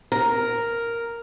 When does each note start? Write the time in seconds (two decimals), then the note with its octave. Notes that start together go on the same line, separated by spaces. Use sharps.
0.12 A#4